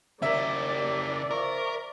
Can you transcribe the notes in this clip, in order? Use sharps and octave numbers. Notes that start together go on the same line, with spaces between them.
D#2 C#3 A#4 D5 E5
F3 A#4 C#6